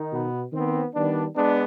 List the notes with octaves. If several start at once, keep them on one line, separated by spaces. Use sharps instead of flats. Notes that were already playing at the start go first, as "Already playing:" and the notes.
Already playing: D#3 D#4
B2 B3
D#3 B3 C4
D#3 G3 B3 D4
G#3 B3 D4